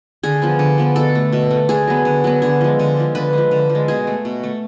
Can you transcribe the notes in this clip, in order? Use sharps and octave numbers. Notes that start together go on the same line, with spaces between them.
D3 G#4
F3 B3
D3
F3 B3
B2 A4
A3
B2
A3
D3 G#4
F#3 B3
D3
F#3 B3
D3 G#4
F3 G#3
D3
F3 G#3
D3 B4
F3 G#3
D3
F3
G#3
B2 G#4
A3
B2
A3